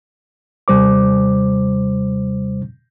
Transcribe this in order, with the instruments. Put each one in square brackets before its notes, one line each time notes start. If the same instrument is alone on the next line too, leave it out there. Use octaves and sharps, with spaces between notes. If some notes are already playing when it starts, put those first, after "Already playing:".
[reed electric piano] D#2 C3 G3 C5 D6